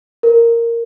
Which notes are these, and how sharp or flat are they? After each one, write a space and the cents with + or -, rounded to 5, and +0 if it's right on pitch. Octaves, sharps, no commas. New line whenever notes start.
A#4 -5